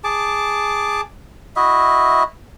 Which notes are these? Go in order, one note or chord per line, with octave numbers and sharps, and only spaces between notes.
G#4 A5 D6
E4 F#4 D#5 E5